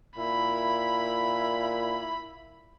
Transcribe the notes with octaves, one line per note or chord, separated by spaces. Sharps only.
A#2 E4 B5